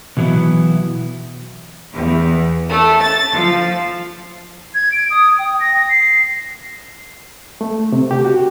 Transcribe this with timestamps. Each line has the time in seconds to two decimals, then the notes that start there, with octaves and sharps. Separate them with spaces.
0.17 B2 E3 F#3 B3 E4
1.94 E2
2.68 A3
3.01 A6
3.33 F3
4.75 G#6
4.92 D7
5.10 D#6
5.39 G5
5.60 A#6
5.89 C7
7.61 A3
7.92 C3
8.11 G4
8.25 F#4